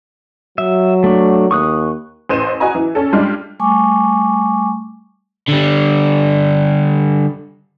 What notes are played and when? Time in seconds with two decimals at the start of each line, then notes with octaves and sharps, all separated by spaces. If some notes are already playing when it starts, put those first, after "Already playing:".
0.58 F#3 E5
1.04 A3 D4
1.51 D#2 C#6 D#6 F#6
2.29 A1 B4 C5 D#7 E7
2.60 F#4 D#5 G#5 A#5
2.75 E3
2.95 C#4 A4
3.13 G3 G#3 D4 F4
3.60 G3 A3 G#5 C#6 D6
5.48 D3 G3